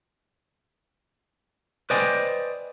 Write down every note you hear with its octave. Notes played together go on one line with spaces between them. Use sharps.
B4 C5 D5 D#5 G5 G#5